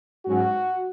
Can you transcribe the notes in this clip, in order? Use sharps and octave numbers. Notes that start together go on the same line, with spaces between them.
G#2 F#3 C#4 F#4